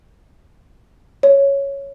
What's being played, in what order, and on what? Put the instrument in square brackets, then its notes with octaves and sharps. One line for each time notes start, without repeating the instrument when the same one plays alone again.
[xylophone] C#5